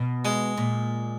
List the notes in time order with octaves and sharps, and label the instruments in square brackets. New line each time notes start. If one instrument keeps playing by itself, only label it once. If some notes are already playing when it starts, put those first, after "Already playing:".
Already playing: [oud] B2
[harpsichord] G#3
[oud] A#2